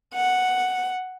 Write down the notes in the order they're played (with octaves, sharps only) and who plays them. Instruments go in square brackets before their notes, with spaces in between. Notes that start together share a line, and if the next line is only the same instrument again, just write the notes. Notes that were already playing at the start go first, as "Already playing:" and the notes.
[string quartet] F#5